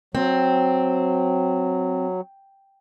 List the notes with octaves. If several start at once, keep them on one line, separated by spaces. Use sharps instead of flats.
F#3 C4